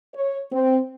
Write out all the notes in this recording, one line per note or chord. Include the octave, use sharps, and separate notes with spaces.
C#5
C4